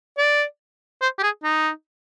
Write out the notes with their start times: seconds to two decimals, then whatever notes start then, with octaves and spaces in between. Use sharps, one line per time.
0.18 D5
1.02 C5
1.18 G4
1.23 G#4
1.44 D#4